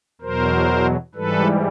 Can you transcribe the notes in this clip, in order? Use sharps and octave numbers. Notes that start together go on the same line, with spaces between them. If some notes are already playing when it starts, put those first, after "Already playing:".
E2 B2 F#3 A#4 C5
G#2 E3 G3 A4 B4